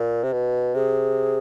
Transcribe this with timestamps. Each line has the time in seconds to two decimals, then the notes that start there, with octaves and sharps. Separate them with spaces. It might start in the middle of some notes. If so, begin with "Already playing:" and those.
Already playing: A#2
0.23 C3
0.33 B2
0.74 C3 G#4